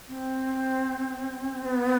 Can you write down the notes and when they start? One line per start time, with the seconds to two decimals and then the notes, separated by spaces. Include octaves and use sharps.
0.08 C4
1.65 B3